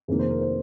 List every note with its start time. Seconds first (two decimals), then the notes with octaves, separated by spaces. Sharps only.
0.08 F1 F2 D#3 A#3 G#4
0.19 C5
0.30 A#4
0.41 C5